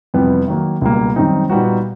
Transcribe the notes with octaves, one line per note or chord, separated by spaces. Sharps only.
F2 C3 E3 G3 B3
D#3 F#3 A#3
C#2 B2 G3 A#3
F#2 D#3 G3 C4 D#4
A#2 G3 B3 D#4 F#4